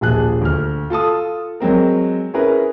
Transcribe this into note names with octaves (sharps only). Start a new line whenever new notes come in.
D#1 A#1 G#4 A5 F#6
D2 F6
F4 A4 A5 D#6
F#3 G#3 C4 A#4
C#4 E4 G#4 A#4 B4